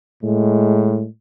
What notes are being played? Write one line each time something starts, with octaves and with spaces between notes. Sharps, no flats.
A2 G#3